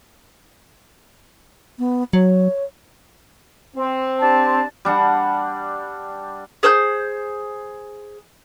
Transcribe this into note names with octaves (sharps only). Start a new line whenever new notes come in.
B3
F#3 C#5
C4
D4 G4 A5
G3 D4 F#5 A5
G#4 C5 E6 G6